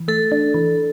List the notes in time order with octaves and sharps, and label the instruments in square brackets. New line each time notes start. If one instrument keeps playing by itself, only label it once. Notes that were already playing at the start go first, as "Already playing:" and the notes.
Already playing: [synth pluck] E3
[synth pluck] A3 [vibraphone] A4
[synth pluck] D4
E3